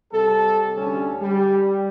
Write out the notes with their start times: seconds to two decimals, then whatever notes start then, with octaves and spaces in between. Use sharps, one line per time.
0.13 C3 G3 A4
0.76 D2 D3 G3 C#4
1.21 G3